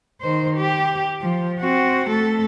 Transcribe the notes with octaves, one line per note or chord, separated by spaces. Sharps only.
D#3 C5
G4
F3
C4 F#4
A3 A4